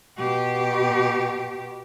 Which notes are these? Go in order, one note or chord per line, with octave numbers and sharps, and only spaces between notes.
B2 G4